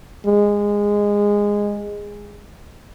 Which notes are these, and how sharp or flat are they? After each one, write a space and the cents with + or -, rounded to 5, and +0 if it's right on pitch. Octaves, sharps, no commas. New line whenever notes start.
G#3 -15